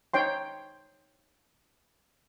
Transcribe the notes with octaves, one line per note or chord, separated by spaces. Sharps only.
D#4 C#5 G5 C6